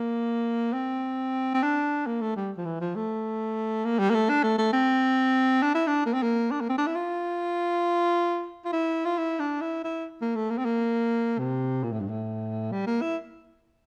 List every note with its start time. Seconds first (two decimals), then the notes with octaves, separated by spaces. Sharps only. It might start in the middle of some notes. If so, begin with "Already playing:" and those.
Already playing: A#3
0.73 C4
1.54 C4
1.63 D4
2.07 A#3
2.21 A3
2.36 G3
2.57 F3
2.65 E3
2.81 F3
2.95 A3
3.85 A#3
3.99 G3
4.10 A#3
4.14 A3
4.29 D4
4.43 A3
4.58 A3
4.73 C4
5.62 D4
5.75 E4
5.87 D4
6.06 A#3
6.14 C4
6.22 A#3
6.51 D4
6.60 A#3
6.69 C4
6.78 D4
6.87 E4
6.95 F4
8.65 F4
8.73 E4
9.05 F4
9.18 E4
9.39 D4
9.61 E4
9.84 E4
10.21 A#3
10.35 A3
10.50 A#3
10.58 C4
10.65 A#3
11.39 C3
11.83 A#2
11.92 A2
12.00 G2
12.08 A2
12.72 G3
12.87 A#3
13.01 E4